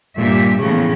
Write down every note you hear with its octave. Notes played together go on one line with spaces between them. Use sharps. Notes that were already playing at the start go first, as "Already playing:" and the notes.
G2 A#2 G4 E5
A2 C#3 E3 F3 B3